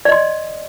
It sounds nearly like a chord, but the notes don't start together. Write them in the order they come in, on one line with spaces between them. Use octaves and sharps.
D5 D#5 C6